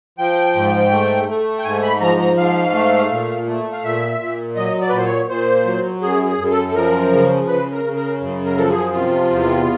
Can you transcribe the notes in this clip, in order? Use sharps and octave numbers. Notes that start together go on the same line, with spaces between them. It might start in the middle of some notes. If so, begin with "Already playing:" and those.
F3 G5
G#2
A3
A3
G5
G#2 G#5
B5
F3 A#5
A#5
G#2 F5
A3
A#2
A3
F5
A#2 E5
A#2
F#3 D#5
D5
B4
A#2
C5
C#5
A#2 C5
F#3
F#2 G#4
G#4
F#2
A4
A4
F3 A#4
C#3
C#3 B4
A#4
C#3
A#4
F#2
A#4
F3 A4
G#4
C3 F4
E2